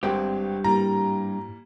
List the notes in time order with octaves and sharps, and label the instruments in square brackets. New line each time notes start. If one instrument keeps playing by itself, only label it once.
[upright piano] G#1 C4 [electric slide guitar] G2 G4
[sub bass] G#2 [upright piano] E3 G3 A#3 [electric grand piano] A#5